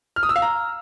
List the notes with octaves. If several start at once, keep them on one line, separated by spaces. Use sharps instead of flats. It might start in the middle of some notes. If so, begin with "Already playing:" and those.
F6
D#6
E6
F5
A#5